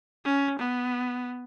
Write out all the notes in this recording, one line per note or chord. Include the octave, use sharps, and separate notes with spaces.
C#4
B3